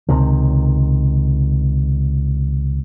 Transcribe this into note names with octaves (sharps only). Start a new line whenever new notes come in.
C#2 C3 D#3